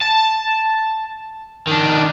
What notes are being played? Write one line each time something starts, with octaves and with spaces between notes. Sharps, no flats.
A5
D#3 D4